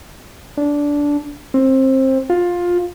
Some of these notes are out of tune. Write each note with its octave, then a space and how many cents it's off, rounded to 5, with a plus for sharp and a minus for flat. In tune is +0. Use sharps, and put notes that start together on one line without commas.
D4 -15
C4 +20
F4 +15